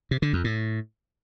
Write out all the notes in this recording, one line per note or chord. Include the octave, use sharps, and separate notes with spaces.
C3
D3
F2
A2